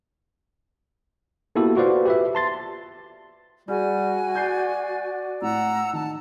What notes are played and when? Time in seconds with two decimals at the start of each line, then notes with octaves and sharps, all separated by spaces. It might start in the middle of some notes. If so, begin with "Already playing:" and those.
1.55 A#3 B3 E4 F#4 G4 A4
1.76 F4 F#4 B4 C5 D5 F5
2.05 G4 B4 E5
2.35 A5 C6 A6
3.68 G3 F#4 G#4 G#5
4.35 D5 G6 C7
5.42 A2 F#5 A#5 E6
5.93 D#3 A5